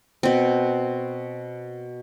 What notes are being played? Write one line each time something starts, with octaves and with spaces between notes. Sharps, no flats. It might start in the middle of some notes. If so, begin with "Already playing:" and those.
B2 C4